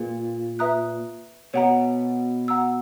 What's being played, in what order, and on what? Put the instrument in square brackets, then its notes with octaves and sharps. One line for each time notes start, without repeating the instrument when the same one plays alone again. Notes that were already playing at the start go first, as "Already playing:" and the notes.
Already playing: [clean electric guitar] A#2 [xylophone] G#4 B4
[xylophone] B4 E5 A#5 D#6 F#6
[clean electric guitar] B2 [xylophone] C#5 F#5 A#5
[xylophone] F#5 A#5 E6